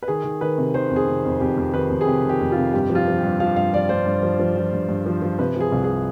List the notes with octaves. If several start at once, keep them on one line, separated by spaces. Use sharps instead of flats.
B4
D#3 G#4
D#3
D#3 B4
C3
D#3 C5
F2
G#4
C3
F2
F2 G4
F2
D#3 B4
F2
G#4
C3 G4
D#3
G4
F2
F4
C3
G2 G4
F3
F4
F3
G4
G2
F3 F5
G2 F5
F3 D5
G2 C5
G2
F3
F3
F3
G2
G2
F3
F3
C3 B4
F3 G#4
C2
G#4